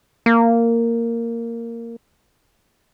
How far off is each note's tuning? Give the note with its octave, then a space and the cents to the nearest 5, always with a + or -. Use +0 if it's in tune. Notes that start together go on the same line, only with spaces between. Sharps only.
A#3 -10